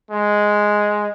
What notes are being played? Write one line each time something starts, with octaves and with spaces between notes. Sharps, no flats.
G#3